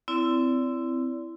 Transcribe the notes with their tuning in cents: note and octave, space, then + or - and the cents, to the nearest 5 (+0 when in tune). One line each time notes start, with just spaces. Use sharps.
C4 -20 E4 +10 D5 -35